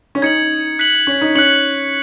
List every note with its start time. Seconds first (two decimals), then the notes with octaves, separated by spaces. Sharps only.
0.15 C#4
0.22 D#4 G#6 C#7 F#7
0.79 F#6 B6 F#7
1.07 C#4
1.21 D#4
1.35 C#4 F#6 C#7 F#7